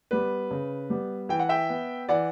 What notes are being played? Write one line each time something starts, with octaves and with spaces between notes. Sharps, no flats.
G3 B3 B4
C#3
G3 B3
E3 G5
F#5
E5 G5
B3
E3 D5 F#5